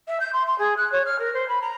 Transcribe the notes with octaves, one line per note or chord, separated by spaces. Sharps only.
E5
G6
C6
C6
G#4
F#6
C#5
F6
A#4
C5
B5
A#5